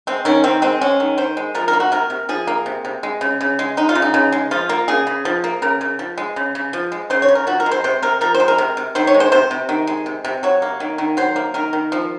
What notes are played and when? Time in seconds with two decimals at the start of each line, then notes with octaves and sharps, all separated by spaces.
0.07 G#3 C4
0.25 D#3 C#4
0.44 D#3 C4
0.62 G#3 C4
0.81 G#3 C#4
1.00 D#3
1.18 D#3 C5
1.37 G#3
1.55 F3 A#4
1.68 A#4
1.73 A#3
1.80 F#4
1.92 C3 A#4
2.10 C3
2.29 F3 G#4
2.47 A#3
2.66 C3
2.85 C3
3.03 G#3
3.21 C#3
3.41 C#3
3.59 G#3
3.77 G#3 D#4
3.89 F4
3.95 C#3
4.02 D#4
4.14 C#3
4.32 G#3
4.51 F3 F4
4.69 A#3
4.88 C#3 G#4
5.07 C#3
5.25 F3
5.44 A#3
5.62 C#3 A#4
5.81 C#3
5.99 F3
6.18 G#3
6.36 C#3
6.55 C#3
6.73 F3
6.92 G#3
7.10 C#3 C5
7.22 C#5
7.28 C#3
7.35 A#4
7.47 F3 F#4
7.60 A#4
7.66 G#3
7.71 C5
7.84 C3 C5
8.02 C3 A#4
8.21 F3 A#4
8.34 C5
8.40 G#3
8.48 A#4
8.58 C3
8.77 C3
8.95 D#3 C5
9.07 C#5
9.14 G#3
9.20 C5
9.32 C3 C5
9.51 C3
9.69 D#3
9.87 G#3
10.06 C3
10.24 C3
10.43 F#3 C#5
10.62 A#3
10.80 D#3
10.98 D#3
11.17 F#3 C5
11.36 A#3
11.54 D#3 A#4
11.73 D#3
11.92 F3